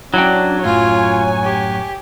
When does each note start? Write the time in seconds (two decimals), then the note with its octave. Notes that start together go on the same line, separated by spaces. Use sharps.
0.14 F#3 C#4 D4 E4 F#5 G5
0.64 F#2 A2 F4 C#5 G#5
1.44 G4